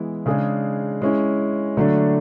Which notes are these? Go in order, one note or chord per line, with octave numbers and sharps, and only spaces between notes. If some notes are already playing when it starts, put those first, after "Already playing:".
Already playing: E3 G#3 B3 E4
C#3 G#3 D4 G#4
G#3 C#4 E4
D3 F#3 A3 D4